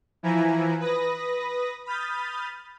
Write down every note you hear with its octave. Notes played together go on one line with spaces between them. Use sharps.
E3 F3 E4 G#5 A#5
B4 D#6 A#6
B5 D#6 F6 G6 A6